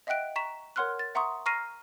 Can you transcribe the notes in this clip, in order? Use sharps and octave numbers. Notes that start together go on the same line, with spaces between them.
D#5 E5 F#5 G5 F#6 D7
A#5 C#6 B6 E7
A#4 C#5 F#5 C6 F6 F#6
A6
E5 F#5 A#5 C6 C#6 D#6
A#5 C#6 F6 A#6 C7 D#7